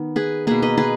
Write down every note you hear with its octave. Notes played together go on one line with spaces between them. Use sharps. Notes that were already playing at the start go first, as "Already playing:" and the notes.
Already playing: D#3 B3
G#4 B4
B2 A#3 G#4 B4
B4 D#5
G#4 B4